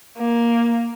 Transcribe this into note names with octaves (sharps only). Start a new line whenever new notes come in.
A#3